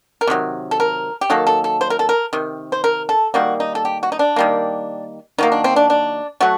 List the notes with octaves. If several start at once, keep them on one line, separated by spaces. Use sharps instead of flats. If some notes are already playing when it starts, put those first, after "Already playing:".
A#4
C3 D#3 F#3
A4
A#4
G4
D#3 F#3 A#3 A4
A4
A4
C5
A#4
A4
A#4
C3 D#3
C5
A#4
A4
D#3 G3 A#3 F#4
D#4
A4
G4
F#4
D#4
D4
D#3 G3 A#3
D#3 F#3 A#3 D#4
D4
C4
D4
D4
F#3 A3 F#4